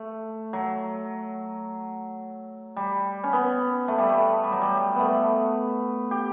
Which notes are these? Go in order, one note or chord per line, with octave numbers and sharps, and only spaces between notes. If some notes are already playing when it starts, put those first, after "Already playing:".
Already playing: A3
F#3
G3
C#4
B3
A3
G3
A3
G3
F#3
G3
A3 B3
G4